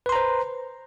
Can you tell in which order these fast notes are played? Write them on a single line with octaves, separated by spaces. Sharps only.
B4 C6 A#5 C5